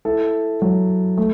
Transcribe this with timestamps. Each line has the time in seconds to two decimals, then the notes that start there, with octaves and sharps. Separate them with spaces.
0.05 E4 A4
0.62 F#3
1.18 A3